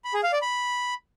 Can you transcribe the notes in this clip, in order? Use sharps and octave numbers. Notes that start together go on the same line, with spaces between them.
B5
G#4
F5
D5
B5